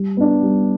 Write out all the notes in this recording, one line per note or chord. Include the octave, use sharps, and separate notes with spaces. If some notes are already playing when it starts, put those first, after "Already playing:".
Already playing: G3
B3 D4
G3